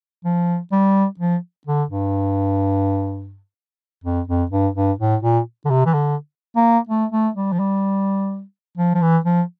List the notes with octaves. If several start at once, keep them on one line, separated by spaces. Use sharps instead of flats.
F3
G3
F3
D3
G2
F2
F2
G2
G2
A2
A#2
D3
C3
E3
D3
A#3
A3
A3
G3
F3
G3
F3
F3
E3
F3